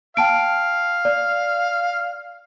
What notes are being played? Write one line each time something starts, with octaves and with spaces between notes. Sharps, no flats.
F5 G5 A5 D7
D5